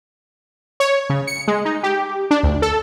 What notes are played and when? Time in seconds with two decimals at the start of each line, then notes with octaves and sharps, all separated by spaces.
0.80 C#5
1.10 C#3
1.27 C#7
1.48 G#3
1.65 D#4
1.83 G4
2.31 D4
2.43 D2
2.62 A4